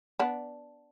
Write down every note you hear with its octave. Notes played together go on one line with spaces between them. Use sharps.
B3 D4